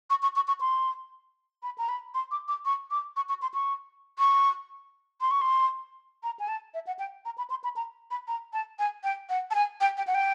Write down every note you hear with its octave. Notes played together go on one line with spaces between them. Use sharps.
C#6
C#6
C#6
C#6
C6
B5
A#5
B5
C6
D6
D6
C#6
D6
C#6
C#6
C6
C#6
C#6
C6
C#6
C6
A#5
G#5
A5
E5
F#5
G5
A#5
B5
C6
B5
A#5
B5
A#5
A5
G#5
G5
F#5
A5
G#5
G5
G5
F#5
G5